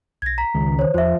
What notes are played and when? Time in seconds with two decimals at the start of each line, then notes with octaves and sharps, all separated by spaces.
0.22 B1 G#6 A#6
0.38 A#5 B6
0.54 C#2 D#3
0.79 C5 C#5
0.94 E2 F3 C5 E5